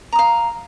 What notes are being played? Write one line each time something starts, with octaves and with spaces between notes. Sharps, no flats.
F5 A#5 D#6